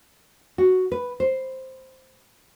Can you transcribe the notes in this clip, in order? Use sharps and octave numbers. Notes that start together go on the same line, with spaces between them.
F#4
B4
C5